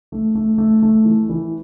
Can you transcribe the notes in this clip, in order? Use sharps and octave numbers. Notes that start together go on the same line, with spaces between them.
A3
A3
A3
A3
E3
E3